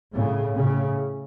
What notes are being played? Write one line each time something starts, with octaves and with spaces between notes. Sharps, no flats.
A2 C#3
A2 C#3